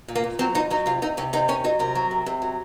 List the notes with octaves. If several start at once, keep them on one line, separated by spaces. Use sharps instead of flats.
A#2
A#3
A#2
F#3 C4
A2 D#4
F#3 D#4
C3 F4
C3 D#4
C3 C#4
C3 D#4
D#3 C#4
F#3 D#4
C3 A#4
F#3
C3
C3
F#3